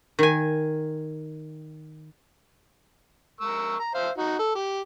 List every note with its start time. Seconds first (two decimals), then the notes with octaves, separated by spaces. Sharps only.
0.19 D#3 G#5
3.41 A#4 C#6 E6
3.80 A#5
3.95 C5 E5 F5
4.18 D#4 F#4
4.39 A4
4.55 G4